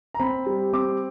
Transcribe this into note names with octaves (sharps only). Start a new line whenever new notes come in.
A#5
C4 B5
G3
C4 D6